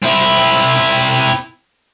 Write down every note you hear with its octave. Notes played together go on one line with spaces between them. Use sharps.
C4 E4